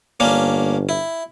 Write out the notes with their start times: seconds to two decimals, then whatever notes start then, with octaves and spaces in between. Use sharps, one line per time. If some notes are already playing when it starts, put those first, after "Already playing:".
0.20 G1 A#3 C#4 D4
0.89 E4